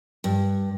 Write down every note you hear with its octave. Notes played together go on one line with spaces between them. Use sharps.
G2